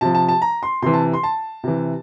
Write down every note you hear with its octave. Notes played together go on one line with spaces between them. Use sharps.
C3 F3 A5
A5
A5
A#5
C6
C3 E3 C6
A5
C6
A5
C3 E3